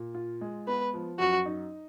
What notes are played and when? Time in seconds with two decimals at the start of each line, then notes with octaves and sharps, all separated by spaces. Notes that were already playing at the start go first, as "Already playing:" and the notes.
Already playing: A#2
0.15 F4
0.41 G#3
0.68 B3 B4
0.94 F3
1.19 F#2 F#4
1.46 D#4